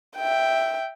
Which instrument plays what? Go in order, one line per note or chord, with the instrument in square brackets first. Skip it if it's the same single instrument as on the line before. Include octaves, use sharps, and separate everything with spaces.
[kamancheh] E5 G5